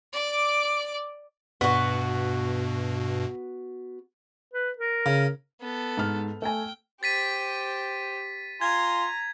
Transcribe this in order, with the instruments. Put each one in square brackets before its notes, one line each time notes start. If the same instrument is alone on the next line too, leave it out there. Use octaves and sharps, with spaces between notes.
[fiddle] D5 D6
[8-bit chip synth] G2 B2 [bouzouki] B3 F#4
[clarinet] B4
A#4
[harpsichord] C#3
[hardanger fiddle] B3 A4
[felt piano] G#2 F6
[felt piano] A3 G#5 [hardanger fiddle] G5
[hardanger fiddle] G4 C5 [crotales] A6 B6 D#7
[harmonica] F4 G#5 C6 [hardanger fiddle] A#5 [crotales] G#6